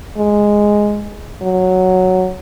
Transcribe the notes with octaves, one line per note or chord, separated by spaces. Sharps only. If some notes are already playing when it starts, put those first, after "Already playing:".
G#3
F#3